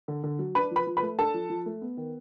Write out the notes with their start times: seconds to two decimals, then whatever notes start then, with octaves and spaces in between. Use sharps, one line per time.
0.08 D3
0.24 D3
0.39 F#3
0.55 D4 B4 B5
0.71 F3 B4 B5
0.87 F3
0.97 B4 B5
1.02 A3
1.19 D4 A4 A5
1.34 F3
1.50 F3
1.66 A3
1.81 B3
1.97 D#3